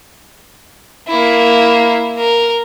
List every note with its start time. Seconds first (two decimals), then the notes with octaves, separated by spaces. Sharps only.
1.08 A#3 E4
2.18 A#4